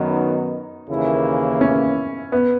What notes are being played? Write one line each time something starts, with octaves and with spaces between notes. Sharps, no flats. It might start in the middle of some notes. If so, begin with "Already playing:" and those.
Already playing: F#2 D#3 F#3 B3 D#4
D#2 C#3 E3 A#3 E4
C#4
B3